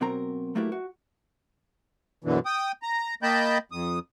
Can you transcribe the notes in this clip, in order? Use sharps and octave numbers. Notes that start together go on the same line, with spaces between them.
B2 F#3 C4 A#4 A#5
F#3 A3 A#3 E4 G4 B4
F#4
F#2 B2 D3 E3
G5 D#6
A#5
A#3 D#5 G5 A5 B5 G6
F2 D#6